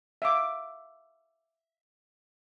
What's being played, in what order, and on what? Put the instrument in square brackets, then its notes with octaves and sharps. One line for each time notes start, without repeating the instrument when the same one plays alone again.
[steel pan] E5 F5 D6